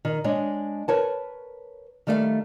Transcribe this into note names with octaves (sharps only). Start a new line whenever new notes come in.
D#3
G#3 D4 C#5 D#5
A#4 B4 C#5 A5
D#3 G3 A3 A4 B4 F5